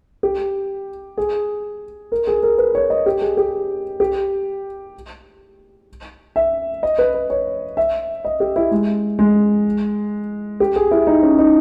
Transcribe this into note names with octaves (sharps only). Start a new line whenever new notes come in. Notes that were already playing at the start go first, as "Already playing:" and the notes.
G4
G#4
A#4
G#4
A#4
B4
C#5
D#5
G4
G#4
G4
G4
E5
D#5
B4
B4
C#5
E5
D#5
G4
E4
G#3
G#3
G4
G#4
E4
D#4
C#4
D#4